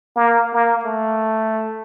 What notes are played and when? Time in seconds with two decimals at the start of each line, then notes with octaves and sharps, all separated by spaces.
0.16 A#3
0.54 A#3
0.84 A3